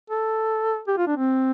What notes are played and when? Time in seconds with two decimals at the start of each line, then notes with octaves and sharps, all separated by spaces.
0.10 A4
0.88 G4
0.97 F4
1.07 D4
1.17 C4